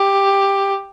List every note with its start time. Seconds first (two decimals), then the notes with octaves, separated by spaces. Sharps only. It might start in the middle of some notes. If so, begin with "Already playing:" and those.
Already playing: G4